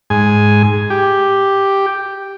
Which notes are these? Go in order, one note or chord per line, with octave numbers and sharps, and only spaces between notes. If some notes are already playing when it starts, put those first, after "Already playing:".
G#2 G#5
G4